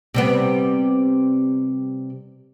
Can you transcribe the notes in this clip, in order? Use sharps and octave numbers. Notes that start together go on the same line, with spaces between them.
C3 G3 B3